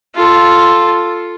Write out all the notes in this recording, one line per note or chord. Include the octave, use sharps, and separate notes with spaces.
F4 A4